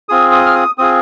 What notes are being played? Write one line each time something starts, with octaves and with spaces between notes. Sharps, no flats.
C4 F4 G#4 D#6
D#6
F6
D#6
C4 F4 G#4 D#6